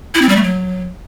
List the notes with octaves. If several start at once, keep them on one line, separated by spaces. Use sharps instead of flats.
E4
C4
G3
A3
F#3